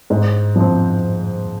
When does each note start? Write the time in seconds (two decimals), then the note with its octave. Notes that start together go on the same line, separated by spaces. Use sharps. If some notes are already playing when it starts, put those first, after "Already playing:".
0.10 G#2
0.56 F3 C4